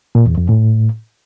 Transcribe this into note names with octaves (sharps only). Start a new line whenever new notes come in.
A#2
E2
F2
A2